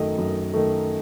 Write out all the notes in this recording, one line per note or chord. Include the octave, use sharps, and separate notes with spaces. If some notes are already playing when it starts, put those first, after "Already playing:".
Already playing: F#2 D#3 A3 D#5
F#2
D#3 A3